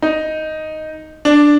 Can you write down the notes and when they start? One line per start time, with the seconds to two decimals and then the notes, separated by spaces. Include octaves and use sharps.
0.02 D#4
1.25 D4